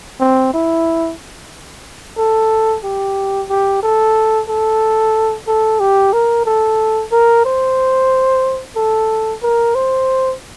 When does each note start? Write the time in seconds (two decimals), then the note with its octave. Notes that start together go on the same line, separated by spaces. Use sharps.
0.20 C4
0.54 E4
2.18 A4
2.84 G4
3.49 G4
3.83 A4
4.48 A4
5.47 A4
5.80 G4
6.13 A#4
6.46 A4
7.12 A#4
7.45 C5
8.76 A4
9.43 A#4
9.75 C5